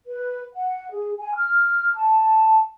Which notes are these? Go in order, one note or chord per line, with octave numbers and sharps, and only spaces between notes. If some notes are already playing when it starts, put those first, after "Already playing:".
B4
F#5
G#4
G#5
F6
A5